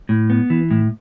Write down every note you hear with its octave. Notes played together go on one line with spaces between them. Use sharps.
A2
B3
E3
A2